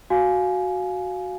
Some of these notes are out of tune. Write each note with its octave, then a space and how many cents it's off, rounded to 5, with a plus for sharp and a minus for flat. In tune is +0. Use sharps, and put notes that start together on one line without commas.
F#4 +0 F5 +0 G#5 +20